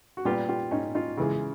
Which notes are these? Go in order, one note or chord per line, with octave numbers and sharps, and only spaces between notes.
F#4
A#2 G3 B3 F4 G4
F4 G4
C#4 D#4
D#4 F4
C#3 E3 G#3